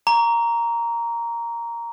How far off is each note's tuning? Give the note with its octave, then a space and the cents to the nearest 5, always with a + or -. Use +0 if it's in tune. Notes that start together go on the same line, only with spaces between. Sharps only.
A#5 +0 C#6 +45